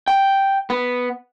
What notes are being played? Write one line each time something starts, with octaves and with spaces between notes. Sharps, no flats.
G5
B3